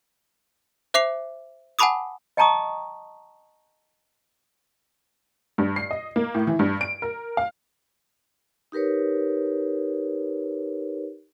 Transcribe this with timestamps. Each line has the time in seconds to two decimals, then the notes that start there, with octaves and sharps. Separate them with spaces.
0.94 C5 E5 D6 C7 F7
1.79 F#5 G#5 A5 B5 D6 D#6
2.37 D#5 G5 A5 A#5 C#6 D#6
5.58 G2
5.76 C7
5.91 D#5
6.16 A#3
6.34 A2
6.47 E3
6.59 G2
6.81 D7
7.02 A#4
7.37 F5
8.72 D#4 G4 A#4 B4 C#5